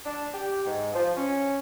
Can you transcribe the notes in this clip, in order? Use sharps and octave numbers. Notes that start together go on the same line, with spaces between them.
D4
G4
G#2
F3
C#4